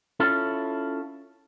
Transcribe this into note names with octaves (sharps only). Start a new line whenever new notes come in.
C#4 E4 F4 A4